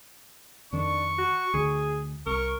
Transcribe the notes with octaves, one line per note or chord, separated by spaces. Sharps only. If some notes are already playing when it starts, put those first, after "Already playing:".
F2 D#3 D4 C#6
F#4
D2 D3 G#4
C2 A#4 C#6